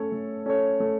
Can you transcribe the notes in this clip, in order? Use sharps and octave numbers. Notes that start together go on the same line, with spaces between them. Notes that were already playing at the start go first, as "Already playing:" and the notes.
Already playing: A3 C#4 A4 C#5
A3
C#4 A4 C#5
A3